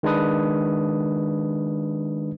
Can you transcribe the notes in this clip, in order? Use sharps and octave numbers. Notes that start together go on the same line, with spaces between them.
D#3 G#3 D4 B4 D#6